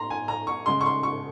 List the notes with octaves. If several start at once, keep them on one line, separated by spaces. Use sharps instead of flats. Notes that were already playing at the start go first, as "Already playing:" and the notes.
Already playing: A#5 C6
G#5
A#5
C#6
C#3 G#3 C6
C#6
C6
C#6